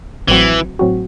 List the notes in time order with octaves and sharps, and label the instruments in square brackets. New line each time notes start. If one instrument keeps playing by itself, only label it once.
[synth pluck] A1 A2 F#3 C4 F#4 [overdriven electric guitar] E3
[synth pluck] A2 F#3 C4 F#4